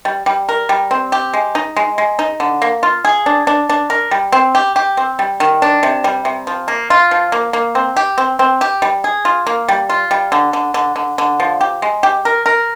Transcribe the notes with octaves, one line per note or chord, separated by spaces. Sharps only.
G3
G3
A#4
G3
C4
G4
G#3
D#4
G#3
G#3
D#4
D3
A#3
F4
G#4
D4
D4
D4
A#4
G3
C4
G4
G4
C4
G3
D#3
D4
C3
G3
C3
F3
A#3
F4
F3
A#3
A#3
C4
G4
C4
C4
G4
G3
G#4
F4
A#3
G3
F4
G3
D3
D3
D3
D3
D3
F3
G4
G#3
G4
A#4
A#4